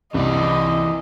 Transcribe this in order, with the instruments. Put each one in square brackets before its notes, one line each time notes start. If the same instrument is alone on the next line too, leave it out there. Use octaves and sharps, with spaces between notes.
[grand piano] C2 [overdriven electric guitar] E3 D5 [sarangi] D#5